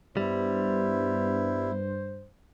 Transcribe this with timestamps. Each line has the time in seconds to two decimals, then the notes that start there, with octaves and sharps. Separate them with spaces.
0.17 G2 G3 B3 E4 C5